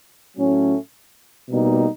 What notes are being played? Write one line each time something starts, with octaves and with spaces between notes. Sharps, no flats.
A2 F#3 A3 C#4
B2 G3 A#3 D#4